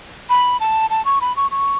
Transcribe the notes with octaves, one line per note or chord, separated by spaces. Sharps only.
B5
A5
A5
C#6
B5
C#6
C#6